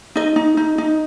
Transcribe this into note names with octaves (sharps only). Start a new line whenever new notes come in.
D#4 D#5
D#4
D#4
D#4